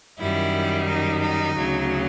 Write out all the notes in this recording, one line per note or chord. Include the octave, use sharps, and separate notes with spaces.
F#2 D#3 G3 E4
D#4
D#4
D2 C#3 F#3